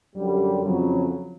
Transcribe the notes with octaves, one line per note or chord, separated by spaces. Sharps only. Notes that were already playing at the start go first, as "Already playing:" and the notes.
F#2 D3 G3
F2 C#3 F#3